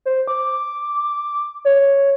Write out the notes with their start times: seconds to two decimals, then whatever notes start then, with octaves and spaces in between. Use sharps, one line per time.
0.06 C5
0.28 D6
1.65 C#5